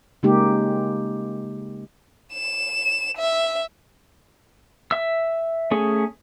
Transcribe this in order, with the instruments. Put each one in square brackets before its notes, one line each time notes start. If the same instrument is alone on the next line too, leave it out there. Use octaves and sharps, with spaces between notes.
[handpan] C#3 G#3 A#3 D#4 G4
[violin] E7
E5
[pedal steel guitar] E5 E6
A3 C#4 G#4